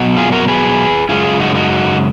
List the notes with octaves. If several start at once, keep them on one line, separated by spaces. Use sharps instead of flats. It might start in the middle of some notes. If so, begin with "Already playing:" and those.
Already playing: B2 F#3
F4 G#4
F#4 A#4
G#4 B4
F#2 C#3 G#3 F4 G#4
D#4 F#4
D#4 F#4